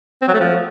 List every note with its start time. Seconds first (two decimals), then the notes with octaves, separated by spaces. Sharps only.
0.22 C4
0.28 F#3
0.34 A3
0.40 F3